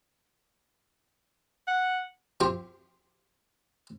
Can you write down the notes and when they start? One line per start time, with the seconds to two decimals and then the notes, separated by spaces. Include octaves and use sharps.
1.67 F#5
2.41 C4 F4 G4 C5